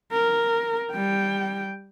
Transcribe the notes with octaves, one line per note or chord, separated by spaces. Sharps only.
A#4
G3 G5